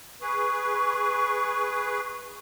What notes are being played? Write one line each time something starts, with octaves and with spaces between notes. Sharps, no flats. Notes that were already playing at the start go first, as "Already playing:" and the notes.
G#4 B4 C#6